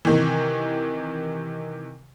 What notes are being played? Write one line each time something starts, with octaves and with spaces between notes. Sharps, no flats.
C3 D#3 E3